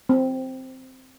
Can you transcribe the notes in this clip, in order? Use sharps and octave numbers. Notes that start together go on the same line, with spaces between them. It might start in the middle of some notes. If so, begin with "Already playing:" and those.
C4